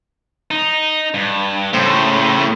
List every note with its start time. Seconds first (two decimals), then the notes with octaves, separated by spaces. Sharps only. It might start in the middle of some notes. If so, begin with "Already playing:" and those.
0.51 D#4
1.14 G2
1.73 A2 C#3 C5